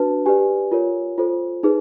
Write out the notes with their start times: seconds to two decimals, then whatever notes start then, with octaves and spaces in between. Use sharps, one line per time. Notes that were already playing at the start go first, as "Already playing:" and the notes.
Already playing: D4 F#4 B4 A5
0.26 G4 B4 D5 G#5
0.71 F4 A#4 C#5
1.18 F4 A4 C5
1.63 D#4 G#4 B4